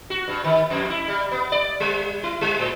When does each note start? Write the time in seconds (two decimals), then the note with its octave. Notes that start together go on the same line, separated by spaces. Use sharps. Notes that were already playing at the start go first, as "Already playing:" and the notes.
0.10 F#4
0.28 G2
0.44 D#3
0.70 F2
0.90 E4
1.08 G3
1.31 B3
1.52 D5
1.80 G3
2.23 E4
2.41 G3
2.59 A2